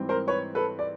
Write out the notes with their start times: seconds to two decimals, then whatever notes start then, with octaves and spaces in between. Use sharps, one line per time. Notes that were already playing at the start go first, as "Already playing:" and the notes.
Already playing: G#2 E3 G3 C4
0.09 A#4 C5
0.28 B4 C#5
0.55 A4 B4
0.79 D5